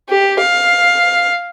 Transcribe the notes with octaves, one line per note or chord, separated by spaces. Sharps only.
G4
F5